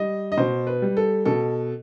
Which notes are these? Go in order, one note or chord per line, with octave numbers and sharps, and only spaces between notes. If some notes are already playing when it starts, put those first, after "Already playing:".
Already playing: G3 D#5
D#5
B2 C5
B4
G3
A4
B2 A4